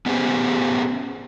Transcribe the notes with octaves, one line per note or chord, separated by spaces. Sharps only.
B3 C#4 G4 G#4 C5 G#5